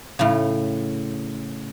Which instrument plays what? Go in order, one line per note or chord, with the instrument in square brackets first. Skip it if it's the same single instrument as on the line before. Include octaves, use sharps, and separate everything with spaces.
[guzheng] A2 C#3